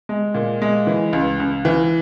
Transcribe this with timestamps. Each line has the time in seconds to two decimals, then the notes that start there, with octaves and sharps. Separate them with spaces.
0.09 G#3
0.34 A#2
0.62 G#3
0.87 E3
1.13 C#2
1.40 C#2
1.65 E3